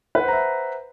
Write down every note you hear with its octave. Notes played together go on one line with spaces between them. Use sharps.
B4 C5 E5 F#5 A#5